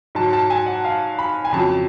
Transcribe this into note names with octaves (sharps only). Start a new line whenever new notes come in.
G#2 F#3 A5
A5
G#5
F#5
F5
B5
G#5
F2 C#3 F#3 A5